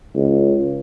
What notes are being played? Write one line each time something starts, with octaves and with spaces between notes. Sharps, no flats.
C#2